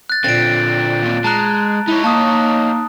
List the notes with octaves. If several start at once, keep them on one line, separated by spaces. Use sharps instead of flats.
F#6 A6
A#2 D3 C4 A6 D7
D#2 C3
G#3 A5 A#5 F#6
D#4 E4 C#5
A#3 A5 D#6